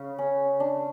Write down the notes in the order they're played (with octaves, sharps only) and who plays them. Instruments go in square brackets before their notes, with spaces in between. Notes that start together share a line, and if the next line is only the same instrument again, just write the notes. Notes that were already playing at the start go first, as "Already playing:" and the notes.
Already playing: [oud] C#3
[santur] C#4
D4